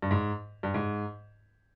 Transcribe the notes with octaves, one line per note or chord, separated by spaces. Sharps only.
G2
G#2
G2
G#2